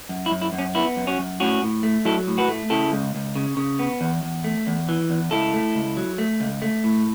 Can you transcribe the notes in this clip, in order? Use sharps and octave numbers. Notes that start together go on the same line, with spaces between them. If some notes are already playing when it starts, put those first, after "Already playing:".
F#2
E4
F#2
E4
F#2
C#4
B3 E4
F#2
C#4 F#4
F#2
A2 C#4 F#4
A2
A3
F#3 E4 A4
A2
F#4 B4
A3
C#3 E4 A4
C#2
C#2
C#3
C#3
B3
E2
E2
A3
E2
E3
E2
C#2 E4 A4
A3
C#2
F#3
A3
C#2
A3
A2